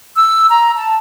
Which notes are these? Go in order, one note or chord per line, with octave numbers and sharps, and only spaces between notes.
E6
A#5
A5